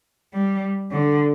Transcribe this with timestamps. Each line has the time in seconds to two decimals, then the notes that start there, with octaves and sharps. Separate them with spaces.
0.33 G3
0.90 D3